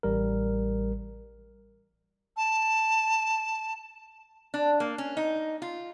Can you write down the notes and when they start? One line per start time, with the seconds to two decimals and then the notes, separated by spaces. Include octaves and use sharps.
0.03 A1 G3 A#4
2.37 A5
4.54 D4
4.80 A#3
4.98 C#4
5.17 D#4
5.62 F4